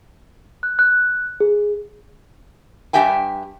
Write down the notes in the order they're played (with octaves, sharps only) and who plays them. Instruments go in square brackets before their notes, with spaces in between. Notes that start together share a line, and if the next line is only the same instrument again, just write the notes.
[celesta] F#6
F#6
G#4
[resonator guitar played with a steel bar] G2 A#3 G4 E5 G5 G#5